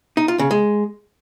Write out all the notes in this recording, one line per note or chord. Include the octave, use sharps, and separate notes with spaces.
D#4
F4
C#3
G#3